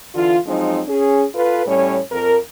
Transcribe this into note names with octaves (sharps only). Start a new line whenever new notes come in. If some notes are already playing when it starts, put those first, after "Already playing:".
D3 E3 F4
F3 F#3 G#3 C4 D#4
C#4 G#4
F4 A4 B4
A2 G3 C#4 C#5
F2 A#4